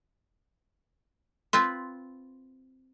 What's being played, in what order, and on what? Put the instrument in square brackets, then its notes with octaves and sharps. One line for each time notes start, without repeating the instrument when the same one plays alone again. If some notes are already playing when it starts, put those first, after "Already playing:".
[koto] C4 F4 B4 [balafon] C6